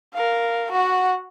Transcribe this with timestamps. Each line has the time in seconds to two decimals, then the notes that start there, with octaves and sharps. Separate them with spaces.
0.14 A#4 F5
0.71 F#4 F#5